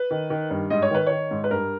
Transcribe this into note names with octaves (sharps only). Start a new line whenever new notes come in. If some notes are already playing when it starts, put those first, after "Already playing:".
Already playing: B4
D#3
D#3
G2
G#2 D#5
C#5
D#3 B4
D#3 C#5
G#2
B4
G2 A#4